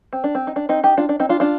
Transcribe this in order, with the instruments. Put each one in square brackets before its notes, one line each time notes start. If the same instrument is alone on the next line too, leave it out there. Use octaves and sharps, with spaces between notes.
[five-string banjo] C4
D4
C4
D#4
D4
C4 D#4
D#4 G4
D4 F4
D4
C4 D#4
D4 F4
D4 F4